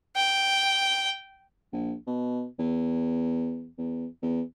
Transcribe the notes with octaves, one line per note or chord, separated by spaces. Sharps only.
G5
A#1
B2
E2
E2
E2